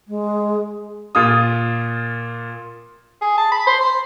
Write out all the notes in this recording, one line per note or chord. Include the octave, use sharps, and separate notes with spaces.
G#3
A#2 F4 D#6
G#4
A5
B5
C5
C6